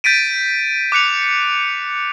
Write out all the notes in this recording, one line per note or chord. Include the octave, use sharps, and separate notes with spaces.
G6 A6 B6 D7 D#7
D6 F#6 C#7 F7